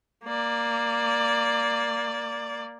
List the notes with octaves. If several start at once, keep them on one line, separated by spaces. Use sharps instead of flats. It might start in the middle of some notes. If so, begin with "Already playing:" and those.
A#3 D5